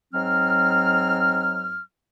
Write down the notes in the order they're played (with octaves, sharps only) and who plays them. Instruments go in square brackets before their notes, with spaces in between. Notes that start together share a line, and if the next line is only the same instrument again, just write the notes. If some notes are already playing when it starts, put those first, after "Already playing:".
[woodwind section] G#2 F#3 C4 F6